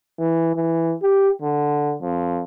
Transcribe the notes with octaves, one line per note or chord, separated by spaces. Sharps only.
E3
E3
G4
D3
F2